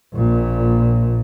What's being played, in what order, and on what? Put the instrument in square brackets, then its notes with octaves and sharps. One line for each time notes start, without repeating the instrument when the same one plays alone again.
[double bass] A#1 A#2